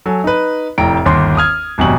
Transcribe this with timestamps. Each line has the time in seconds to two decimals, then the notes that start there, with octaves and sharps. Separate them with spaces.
0.06 F#3 A4 G#5
0.24 D#4 B4
0.78 F1 A2 G5 A#5 D7
1.05 G1 D#2 C6
1.37 D#6 F6 G#6
1.78 G#1 F#2 B2 G4 F#7